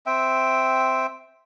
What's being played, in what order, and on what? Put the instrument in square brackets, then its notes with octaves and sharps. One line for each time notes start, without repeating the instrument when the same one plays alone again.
[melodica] C4 E5 G5